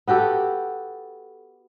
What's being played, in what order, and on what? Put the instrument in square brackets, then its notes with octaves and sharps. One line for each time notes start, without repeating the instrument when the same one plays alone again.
[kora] B3 F#4 G4 A4